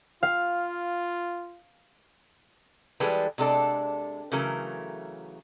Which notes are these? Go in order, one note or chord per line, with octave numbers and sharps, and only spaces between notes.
F4 F5
E3 G3 G#3 G#4 A4 B4
C3 G#3 D4 A4 D5
C#3 E3 F#3 A3 A#4